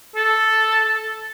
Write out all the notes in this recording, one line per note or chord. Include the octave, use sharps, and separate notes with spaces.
A4